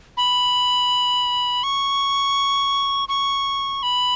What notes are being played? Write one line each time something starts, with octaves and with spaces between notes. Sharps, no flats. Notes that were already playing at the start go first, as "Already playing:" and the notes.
B5
C#6
C#6
B5